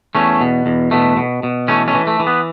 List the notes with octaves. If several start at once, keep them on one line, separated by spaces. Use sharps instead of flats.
E2 A3 C#4
B2
E2
B2 A3
B2
B2
E3 A3 C#4
A3 C#4
E3
A3
E3
B3